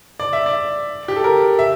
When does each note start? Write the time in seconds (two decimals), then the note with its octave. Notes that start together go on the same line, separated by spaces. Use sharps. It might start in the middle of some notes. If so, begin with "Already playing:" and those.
0.20 D5
0.33 E5
0.46 D5
1.08 G4
1.16 A4
1.24 A#4
1.59 E5